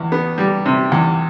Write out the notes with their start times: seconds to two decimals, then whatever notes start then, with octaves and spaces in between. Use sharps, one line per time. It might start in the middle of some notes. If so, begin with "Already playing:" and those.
Already playing: E2
0.12 B3
0.38 G3
0.65 C3
0.92 E2